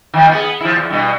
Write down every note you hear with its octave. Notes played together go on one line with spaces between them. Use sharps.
D#3 F3
B3 G#4
F3 E4
E2
G2 B2